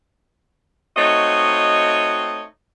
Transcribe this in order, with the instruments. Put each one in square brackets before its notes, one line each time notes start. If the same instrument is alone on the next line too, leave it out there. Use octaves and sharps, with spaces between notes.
[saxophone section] A3 C4 D#4 F#4 C#5 D#5